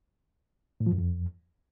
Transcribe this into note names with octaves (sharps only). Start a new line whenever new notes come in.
A2
F3
F#2
F2